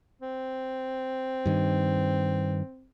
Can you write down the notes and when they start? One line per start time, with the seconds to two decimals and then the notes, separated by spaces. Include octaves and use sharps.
0.21 C4
1.46 G2 D#3